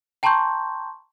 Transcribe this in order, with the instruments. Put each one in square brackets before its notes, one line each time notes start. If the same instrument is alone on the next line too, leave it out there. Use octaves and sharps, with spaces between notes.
[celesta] G5 A5 A#5 C6 C#6 G6